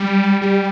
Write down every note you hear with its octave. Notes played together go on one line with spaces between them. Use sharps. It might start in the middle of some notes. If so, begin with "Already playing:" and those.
Already playing: G3
G3